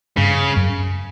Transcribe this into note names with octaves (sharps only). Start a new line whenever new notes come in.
G2 C#3
F#2